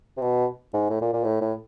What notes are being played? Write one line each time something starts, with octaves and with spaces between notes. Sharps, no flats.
C3
B2
G#2
A2
A#2
A#2
A2
A2